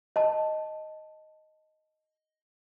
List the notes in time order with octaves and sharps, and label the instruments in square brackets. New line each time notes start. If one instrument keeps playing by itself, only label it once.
[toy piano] D#5 A5